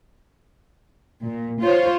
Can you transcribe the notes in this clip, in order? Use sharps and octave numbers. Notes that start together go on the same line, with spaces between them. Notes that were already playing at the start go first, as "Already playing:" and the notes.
A#2
F4 C5 C#5